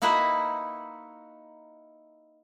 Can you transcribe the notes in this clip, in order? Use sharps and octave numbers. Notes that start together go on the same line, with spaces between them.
A#3 D#4 E4 F#4 A#4 B4